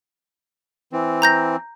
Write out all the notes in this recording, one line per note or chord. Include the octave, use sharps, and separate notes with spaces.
E3 C4
A#5 G6 A#6